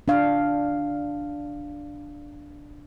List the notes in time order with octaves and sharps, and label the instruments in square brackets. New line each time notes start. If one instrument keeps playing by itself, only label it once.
[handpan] D4 F5